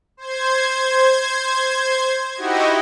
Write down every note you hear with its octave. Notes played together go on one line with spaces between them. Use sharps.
C5 G#6
D#4 E4 F#4 G4 D#5